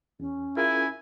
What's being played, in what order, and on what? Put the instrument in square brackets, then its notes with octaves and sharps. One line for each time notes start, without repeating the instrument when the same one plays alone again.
[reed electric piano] E2 [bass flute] C#4
[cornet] E4 [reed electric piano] F4 G#4 A#4 [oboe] G#5